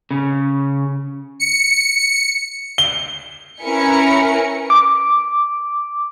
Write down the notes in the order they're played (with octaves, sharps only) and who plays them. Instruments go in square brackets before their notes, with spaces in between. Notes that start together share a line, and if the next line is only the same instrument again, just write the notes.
[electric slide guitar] C#3
[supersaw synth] C#7
[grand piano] G7
[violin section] C#4 E4 A#4 B4 G#5 C#7
[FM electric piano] D6